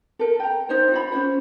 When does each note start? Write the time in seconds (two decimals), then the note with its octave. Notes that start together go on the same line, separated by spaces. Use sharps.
0.19 A4 A#4
0.40 G5 A#5
0.69 D#4 C5 C#5
0.92 F4 C#5 B5
1.12 C#4 F4 C5 C#5